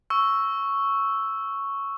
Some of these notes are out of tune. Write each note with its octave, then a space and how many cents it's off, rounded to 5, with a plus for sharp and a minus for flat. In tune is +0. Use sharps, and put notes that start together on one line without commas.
C#6 +0 E6 +0